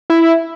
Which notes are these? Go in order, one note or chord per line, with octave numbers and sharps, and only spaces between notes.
E4